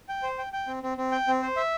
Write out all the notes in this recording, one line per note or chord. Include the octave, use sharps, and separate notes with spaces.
G5
C5
G5
G5
C4
C4
C4
G5
C4
C5
E5